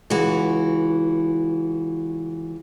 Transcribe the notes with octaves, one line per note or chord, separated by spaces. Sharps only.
C#2 E3 F#4